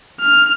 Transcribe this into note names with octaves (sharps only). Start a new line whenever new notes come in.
F6